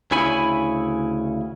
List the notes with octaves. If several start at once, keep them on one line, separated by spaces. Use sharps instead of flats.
D2 C#3 E4 C#5 G#5 B5